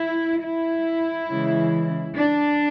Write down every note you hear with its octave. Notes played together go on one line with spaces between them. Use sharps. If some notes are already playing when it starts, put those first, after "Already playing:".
Already playing: E4
E4
C#3 E3 G#3
D4